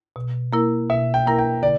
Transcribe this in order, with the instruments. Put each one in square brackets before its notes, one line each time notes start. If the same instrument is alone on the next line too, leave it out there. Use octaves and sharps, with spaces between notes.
[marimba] B2
A#3 E4 A#4
[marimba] B2 [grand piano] E5
[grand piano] G5
[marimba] A#3 E4 A#4 [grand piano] A#5
[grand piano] G5
[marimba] D3 [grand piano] D5